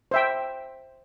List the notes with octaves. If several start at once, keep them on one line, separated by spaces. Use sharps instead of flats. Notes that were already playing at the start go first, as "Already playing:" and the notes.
C5 E5 G5